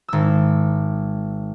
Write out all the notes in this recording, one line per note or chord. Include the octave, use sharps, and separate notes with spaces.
G#1 E6